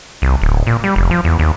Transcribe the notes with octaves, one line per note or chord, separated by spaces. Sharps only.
C2
D1
A#2
G3
F1
F3
E2
D#2